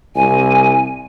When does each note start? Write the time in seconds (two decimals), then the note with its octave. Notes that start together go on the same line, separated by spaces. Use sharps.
0.16 C2 G#5